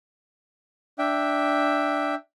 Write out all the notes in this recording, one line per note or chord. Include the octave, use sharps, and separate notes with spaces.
D4 E5 G5